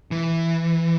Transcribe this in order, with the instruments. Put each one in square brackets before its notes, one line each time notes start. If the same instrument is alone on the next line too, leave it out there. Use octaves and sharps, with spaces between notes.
[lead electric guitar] E3